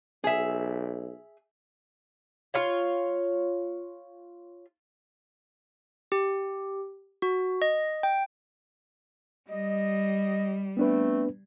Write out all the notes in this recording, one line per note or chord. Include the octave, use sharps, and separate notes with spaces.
B1 G#4 E5
F4 C#5 F5
G4
F#4
D#5
G5
G3 D#5
A3 B3 C4 D4 B4